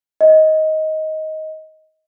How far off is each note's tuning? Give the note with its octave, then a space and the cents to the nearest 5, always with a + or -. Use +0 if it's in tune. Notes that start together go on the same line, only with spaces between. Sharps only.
D#5 +15